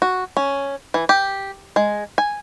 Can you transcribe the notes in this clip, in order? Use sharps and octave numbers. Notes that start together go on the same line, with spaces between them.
F#4
C#4
E3
G4
G#3
G#5